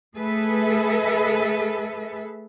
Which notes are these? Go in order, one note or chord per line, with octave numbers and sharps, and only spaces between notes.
A3 G#4 A4 B4 E5